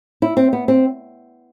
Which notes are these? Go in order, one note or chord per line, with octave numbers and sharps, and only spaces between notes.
E4
C4
B3
C4